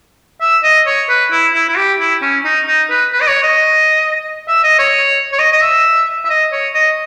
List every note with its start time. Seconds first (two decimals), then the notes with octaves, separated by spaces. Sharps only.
0.41 E5
0.64 D#5
0.86 C#5
1.09 B4
1.32 E4
1.54 E4
1.69 E4
1.77 G4
1.99 E4
2.22 C#4
2.45 D#4
2.67 D#4
2.90 B4
3.13 B4
3.21 D#5
3.28 C#5
3.43 D#5
4.49 E5
4.64 D#5
4.79 C#5
5.33 C#5
5.39 D#5
5.52 D#5
5.62 E5
6.25 E5
6.30 D#5
6.52 C#5
6.75 D#5